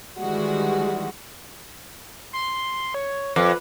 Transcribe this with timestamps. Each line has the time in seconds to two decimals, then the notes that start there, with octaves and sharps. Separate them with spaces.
0.18 D#3 E3 G3 G#3 F#4
2.33 C6
2.94 C#5
3.36 F2 B4